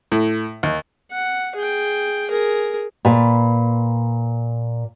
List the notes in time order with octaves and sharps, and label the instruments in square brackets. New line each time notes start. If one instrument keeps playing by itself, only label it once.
[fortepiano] A2
D#2
[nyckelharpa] F#5
G#4 G5
G#4 A#4
[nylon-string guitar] A#2 B4